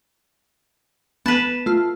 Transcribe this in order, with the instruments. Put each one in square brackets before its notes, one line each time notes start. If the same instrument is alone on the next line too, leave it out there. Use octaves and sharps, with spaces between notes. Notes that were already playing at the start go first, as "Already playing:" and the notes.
[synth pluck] B3 [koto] B4 A5
[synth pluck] A3 F4